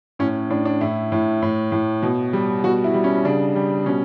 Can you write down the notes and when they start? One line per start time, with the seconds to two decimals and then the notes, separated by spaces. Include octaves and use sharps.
0.19 A2 C#4
0.50 A2 D4
0.65 D4
0.81 A2 E4
1.12 A2
1.42 A2
1.72 A2
2.02 B2
2.33 G3
2.64 B2 F#4
2.84 E4
2.94 G3
3.04 C#4
3.25 C#3 D4
3.55 G3
3.86 B2 C#4